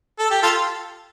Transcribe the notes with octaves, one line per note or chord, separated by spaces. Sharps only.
A4
G4
F4 A4